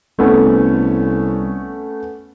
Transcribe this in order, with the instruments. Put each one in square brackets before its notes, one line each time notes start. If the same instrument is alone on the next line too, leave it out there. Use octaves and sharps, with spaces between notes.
[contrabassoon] C2 [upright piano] A3 B3 C#4